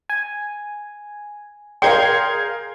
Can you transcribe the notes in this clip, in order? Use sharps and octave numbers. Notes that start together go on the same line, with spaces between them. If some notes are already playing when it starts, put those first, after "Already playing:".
G#5
G#4 A#4 F5 G5 C6 G6 G#6